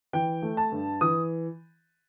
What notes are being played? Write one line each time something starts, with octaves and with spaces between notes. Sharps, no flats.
E3 G5
A3
A5
G2
E3 D#6